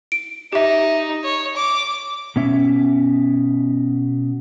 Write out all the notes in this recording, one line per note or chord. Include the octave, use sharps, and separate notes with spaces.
D7
D#4 G4 E5
C#5
D6
B2 C#4 E5